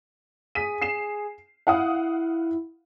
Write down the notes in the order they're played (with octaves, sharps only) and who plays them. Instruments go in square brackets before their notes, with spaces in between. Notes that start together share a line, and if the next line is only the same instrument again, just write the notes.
[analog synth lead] G#4 [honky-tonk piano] B6 D#7
[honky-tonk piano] C7 E7
[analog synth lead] E4 [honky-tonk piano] F5 F#5 D#6